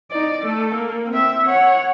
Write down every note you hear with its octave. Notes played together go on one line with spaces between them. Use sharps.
D#4 D5
A3 A4
A#3
C4 E5
C#5 F#5